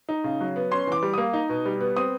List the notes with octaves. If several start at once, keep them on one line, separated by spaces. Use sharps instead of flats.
D#4
C#3
F#3
B3
C#4 C6
E3 D6
G3
A#3 D#6
D#4
B2
G3
B3
C4 D#6